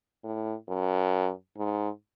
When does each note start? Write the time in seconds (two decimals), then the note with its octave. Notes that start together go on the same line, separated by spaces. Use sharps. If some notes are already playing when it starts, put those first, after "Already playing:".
0.24 A2
0.68 F#2
1.58 G#2